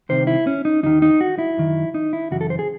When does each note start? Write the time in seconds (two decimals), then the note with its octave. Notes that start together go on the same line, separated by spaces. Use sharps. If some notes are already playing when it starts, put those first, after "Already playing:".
0.09 C2 C3 D#3 C5
0.27 E4
0.47 C#4
0.65 D#4
0.83 D#2 D#3 D#4
1.02 D#4
1.21 F#4
1.39 E4
1.57 F#2 D#3
1.94 D#4
2.13 E4
2.31 F#2 C#3 E3 F#4
2.41 A4
2.50 C5
2.59 G#4